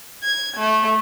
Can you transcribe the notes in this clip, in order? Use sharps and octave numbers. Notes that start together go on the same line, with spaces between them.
G#6
A3